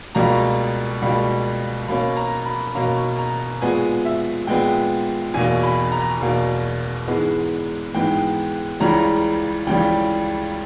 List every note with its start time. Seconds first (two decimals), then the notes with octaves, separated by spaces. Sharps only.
0.15 C#2 B2 G3 A#3 A#5
1.02 C#2 B2 G3 A#3
1.88 B2 A#3 C#4 B5
2.17 A#5
2.46 B5
2.75 B2 A#3 C#4 A#5
3.18 A#5
3.62 A#2 G#3 B3 G#5
4.05 E5
4.47 A#2 G#3 B3 G5
5.34 E2 B2 A#3 G#5
5.63 B5
5.92 A#5
6.21 E2 B2 A#3
7.07 G#2 E3 G#3 B3
7.95 G#2 E3 G#3 B3 G5
8.80 C#2 C#3 E3 G3 A#5
9.67 C#2 C#3 E3 G3 G5